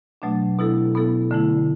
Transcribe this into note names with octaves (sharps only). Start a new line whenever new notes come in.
B2 F#3 A3 D4
B2 B3 E4 A4
B2 B3 E4 A4
D3 A3 E4